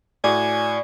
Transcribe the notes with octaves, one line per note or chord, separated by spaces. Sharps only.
A2 F#4 D5 G#5